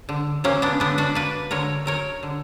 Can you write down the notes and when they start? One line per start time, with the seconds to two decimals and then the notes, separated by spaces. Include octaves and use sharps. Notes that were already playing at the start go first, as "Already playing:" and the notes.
0.09 D3
0.44 F#3 A#3 C#4
0.62 B3 D4
0.80 D3 B3 D4
0.98 D4 F#4
1.15 A#3 B4 D5
1.51 D3 A#4 C#5
1.86 F#3 A#4 C#5
2.23 D3